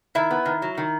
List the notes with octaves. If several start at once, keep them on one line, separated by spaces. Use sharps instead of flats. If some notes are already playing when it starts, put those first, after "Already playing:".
D#3 E4 E5
B3
D#3
F#3
D#3